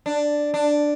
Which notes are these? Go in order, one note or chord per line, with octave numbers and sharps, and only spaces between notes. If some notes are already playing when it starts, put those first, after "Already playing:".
D4
D4